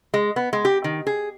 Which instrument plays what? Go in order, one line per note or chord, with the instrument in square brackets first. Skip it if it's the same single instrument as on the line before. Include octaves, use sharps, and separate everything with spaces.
[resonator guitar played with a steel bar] G#3
B3
G#3
G4
D#3
G#4